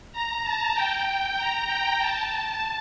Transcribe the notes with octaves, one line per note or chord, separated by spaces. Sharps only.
A#5
A5
G5
A#5
G5
A5
A5